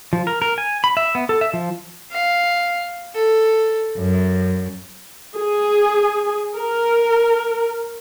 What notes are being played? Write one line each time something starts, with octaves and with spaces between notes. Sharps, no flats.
F3
A#4
A#4
G#5
B5
E5
B3
A4
E5
F3
F5
A4
F#2
G#4
A#4